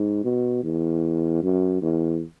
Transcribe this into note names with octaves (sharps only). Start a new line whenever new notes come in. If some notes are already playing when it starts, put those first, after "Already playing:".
Already playing: G#2
B2
E2
F#2
E2